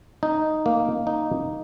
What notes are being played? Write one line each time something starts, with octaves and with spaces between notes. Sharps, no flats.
D#4
A#3
D#4